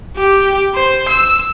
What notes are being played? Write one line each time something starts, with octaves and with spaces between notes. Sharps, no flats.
G4
C5
E6